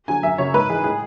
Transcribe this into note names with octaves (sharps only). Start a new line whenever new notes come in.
D3 F#3 G#5
F#2 E5
C#3 F#3 C#5
G#2 B4
E3 G#4
A2 G#4